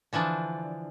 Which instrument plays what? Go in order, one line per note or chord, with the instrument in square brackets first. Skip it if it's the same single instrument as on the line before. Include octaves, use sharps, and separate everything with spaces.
[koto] D3 E3 F3 D4